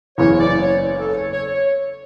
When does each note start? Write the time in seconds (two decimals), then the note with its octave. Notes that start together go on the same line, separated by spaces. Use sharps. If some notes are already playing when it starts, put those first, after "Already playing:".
0.18 F#1 E2 C#3 E3 C#5
0.33 C#5
0.39 D5
0.62 C#5
0.99 A4
1.15 C#5
1.32 C#5
1.47 C#5